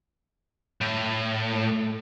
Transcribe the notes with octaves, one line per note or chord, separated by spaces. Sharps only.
A2
A3